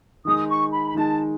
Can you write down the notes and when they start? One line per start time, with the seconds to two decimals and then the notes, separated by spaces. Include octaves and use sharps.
0.25 D#3 G#3 D#4 D#6
0.49 C#6
0.72 B5
0.90 B5
0.94 D#3 G#3 D#4 A5